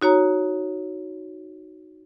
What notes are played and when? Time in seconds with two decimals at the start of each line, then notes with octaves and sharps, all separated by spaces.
0.02 D#4 F#4 C#5 A#5